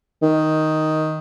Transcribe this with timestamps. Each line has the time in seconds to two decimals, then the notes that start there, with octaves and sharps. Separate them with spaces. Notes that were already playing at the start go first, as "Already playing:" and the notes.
0.22 D#3